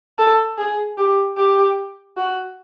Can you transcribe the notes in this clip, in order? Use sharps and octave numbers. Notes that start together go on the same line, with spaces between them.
A4
G#4
G4
G4
F#4